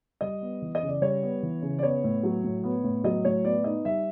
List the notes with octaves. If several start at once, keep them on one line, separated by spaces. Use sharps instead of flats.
G3 D#5
B3
E3
D#5
C#3
D5
G3 C#5
B3
E3
C#3
D5
B3 C#5
A2
F#3
A2
B3
A2
F#3 D#5
A2 C#5
B3 D5
D#4 D#5
G3 E5